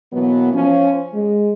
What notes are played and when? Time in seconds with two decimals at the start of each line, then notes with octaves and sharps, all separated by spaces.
0.13 B2 E3 F#3 A#3 B3
0.53 F3 C#4
1.14 G#3